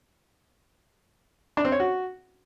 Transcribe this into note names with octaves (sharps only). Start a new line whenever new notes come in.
D4
C4
C#5
F#4